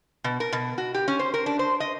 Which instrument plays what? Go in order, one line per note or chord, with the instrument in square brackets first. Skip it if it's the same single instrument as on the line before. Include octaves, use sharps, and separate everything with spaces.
[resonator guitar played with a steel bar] B2
A#4
B2
F#4
G4
C#4
C5
A#4
D4
C5
D#5